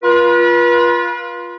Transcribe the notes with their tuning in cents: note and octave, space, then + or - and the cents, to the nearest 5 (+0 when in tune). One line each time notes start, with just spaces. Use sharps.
F4 +0 B4 -35